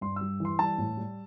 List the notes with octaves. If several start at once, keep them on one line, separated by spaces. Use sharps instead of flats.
G2 C6
G3 E6
E3 C6
G3 A5
A2
G3